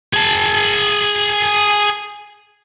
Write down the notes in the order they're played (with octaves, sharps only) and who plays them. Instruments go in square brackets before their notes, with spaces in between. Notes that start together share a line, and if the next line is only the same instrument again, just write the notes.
[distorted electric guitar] G#4 A5